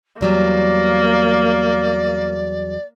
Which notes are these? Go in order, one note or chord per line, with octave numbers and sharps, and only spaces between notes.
E2 F#3 G3 A#3 D5